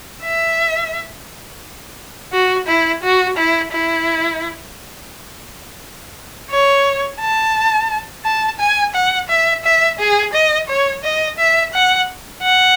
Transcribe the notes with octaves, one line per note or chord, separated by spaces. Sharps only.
E5
F#4
E4
F#4
E4
E4
C#5
A5
A5
G#5
F#5
E5
E5
G#4
D#5
C#5
D#5
E5
F#5
F#5